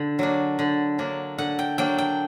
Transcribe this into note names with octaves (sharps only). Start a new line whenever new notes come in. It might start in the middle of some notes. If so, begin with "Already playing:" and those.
Already playing: D3
F#3 A#3 D4
D3
F#3 A#3 D4
D3 F#5
G5
F#3 A#3 D4 G5
G5